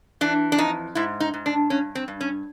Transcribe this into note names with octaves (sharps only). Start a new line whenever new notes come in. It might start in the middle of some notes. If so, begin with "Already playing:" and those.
E3 D4
D4
F2 D#4
G#2 E4
D#4
G#2
D4
G2 C#4
C4
G2
C#4